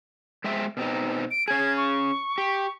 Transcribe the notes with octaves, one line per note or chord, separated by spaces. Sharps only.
G#3 C4 E5
B2 C4 D#4
D7
C#4 G#4 G#6
C#6
G4